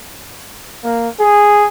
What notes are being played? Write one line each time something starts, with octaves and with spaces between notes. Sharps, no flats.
A#3
G#4